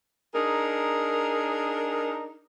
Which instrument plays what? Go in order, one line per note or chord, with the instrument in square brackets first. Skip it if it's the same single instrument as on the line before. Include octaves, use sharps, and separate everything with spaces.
[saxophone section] D4 D#4 G#4 A#4